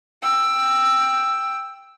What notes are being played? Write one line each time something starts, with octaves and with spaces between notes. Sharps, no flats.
G5 E6